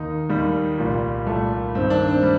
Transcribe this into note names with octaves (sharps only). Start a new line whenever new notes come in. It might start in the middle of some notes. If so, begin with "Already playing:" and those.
Already playing: D#2 D#3 D#4
D#2 D#3 G3
C2 A#2
C2 A#2 A3
G2 D#3 C4
D4
C4
G3